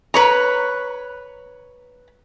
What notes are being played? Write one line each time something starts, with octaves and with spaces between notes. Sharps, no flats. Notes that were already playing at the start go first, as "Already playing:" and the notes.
B4 C#5 A#5